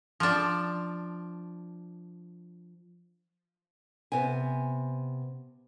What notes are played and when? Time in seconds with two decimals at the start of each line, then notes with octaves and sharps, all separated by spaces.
0.20 F3 D4
4.12 C3 B3 G#5